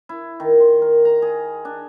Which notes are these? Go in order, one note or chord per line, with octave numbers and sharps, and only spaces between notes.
E4
D#3
C6
A#4
A#5
G#4
D4